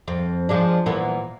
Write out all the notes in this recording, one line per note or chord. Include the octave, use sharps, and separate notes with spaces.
F2
F3 G#3 D4
A#2 E3 B3